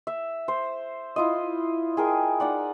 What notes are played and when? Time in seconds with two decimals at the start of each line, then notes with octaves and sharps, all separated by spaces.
0.07 E5
0.48 C5
1.16 E4 F4 D#5
1.97 G#4 A#4 G5
2.40 D#4 D5 F#5